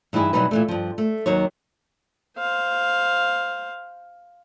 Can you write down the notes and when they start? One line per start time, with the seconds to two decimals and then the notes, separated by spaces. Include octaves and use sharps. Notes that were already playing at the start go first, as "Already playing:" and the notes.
0.13 G2 E3 D#4 E4 G#4
0.33 B2 E3 F#3 G3 D#4 B4
0.51 A#2 E3 A3
0.68 G2 F3
0.98 A3
1.26 D#2 D#3 F#3 D#4 C#5
2.38 C5 F5